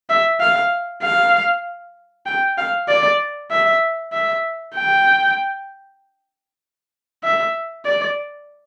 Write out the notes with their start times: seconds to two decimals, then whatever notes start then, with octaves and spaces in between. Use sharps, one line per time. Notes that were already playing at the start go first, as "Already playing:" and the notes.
0.09 E5
0.40 F5
1.02 F5
2.26 G5
2.58 F5
2.88 D5
3.51 E5
4.13 E5
4.75 G5
7.24 E5
7.85 D5